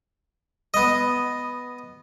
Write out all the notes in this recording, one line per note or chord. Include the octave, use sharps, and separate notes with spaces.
B3 D#5